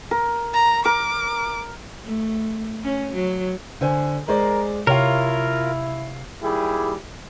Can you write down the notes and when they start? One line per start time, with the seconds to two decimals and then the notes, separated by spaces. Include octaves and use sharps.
0.11 A#4
0.54 A#5
0.85 A#4 D6
2.04 A3
2.84 C#4
3.14 F#3
3.81 D3 C5 G#5
4.28 G#3 A#4 C5 D5
4.87 C3 E4 F4 A#4 C#5 F5
6.42 D#2 G3 E4 G4 G#4